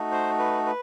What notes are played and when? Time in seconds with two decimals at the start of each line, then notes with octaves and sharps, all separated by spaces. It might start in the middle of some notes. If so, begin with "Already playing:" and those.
Already playing: A3 D#4 F#4
0.12 C5
0.39 B4
0.66 B4